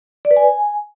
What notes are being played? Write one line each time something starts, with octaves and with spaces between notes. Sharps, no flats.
D5
B4
G#5